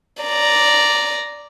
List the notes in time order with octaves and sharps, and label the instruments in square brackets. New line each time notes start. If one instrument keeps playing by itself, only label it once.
[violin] D5 A#5